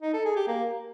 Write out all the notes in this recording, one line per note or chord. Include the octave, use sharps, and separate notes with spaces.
D#4
A4
G#4
G4
A#3